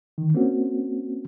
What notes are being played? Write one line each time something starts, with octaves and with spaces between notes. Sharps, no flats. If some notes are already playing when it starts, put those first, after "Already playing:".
D#3
A#3 C4 C#4 F#4